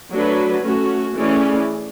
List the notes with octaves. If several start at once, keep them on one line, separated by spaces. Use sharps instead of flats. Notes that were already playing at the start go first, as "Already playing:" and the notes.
F#3 A3 D4 F#4 B4
A3 C#4 F#4
E3 A3 C#4 G#4 D5